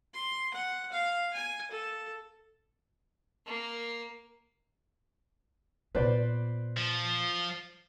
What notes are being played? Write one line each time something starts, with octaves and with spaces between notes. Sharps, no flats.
C6
F#5
F5
G#5
A4
A#3
A#2 B3 B4 C5 D5
F3